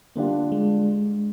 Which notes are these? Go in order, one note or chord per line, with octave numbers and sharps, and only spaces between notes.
D3 G3 A#3 D4 F4
G#3